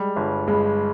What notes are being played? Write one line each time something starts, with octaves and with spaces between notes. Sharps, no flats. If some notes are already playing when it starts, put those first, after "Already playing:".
Already playing: G3 G#3
G1
G2 G#3